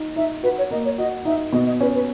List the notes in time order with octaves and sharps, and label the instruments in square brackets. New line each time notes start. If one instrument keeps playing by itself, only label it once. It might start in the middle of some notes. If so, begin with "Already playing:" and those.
Already playing: [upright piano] D#4
[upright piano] D#4 [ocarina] E5
[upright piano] F#4 [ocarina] B4
[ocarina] C#5
[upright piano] A#3 [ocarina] D#5
[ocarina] C#5
[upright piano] F#4 [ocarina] D#5
[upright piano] D#4 [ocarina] E5
[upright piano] B2 [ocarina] D#5
[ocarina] D#5
[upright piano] C#4 [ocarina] B4
[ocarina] B4